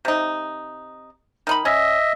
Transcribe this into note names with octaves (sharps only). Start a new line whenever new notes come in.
C3 D#4
D#3 D#4 B5
C#4 D#5 E5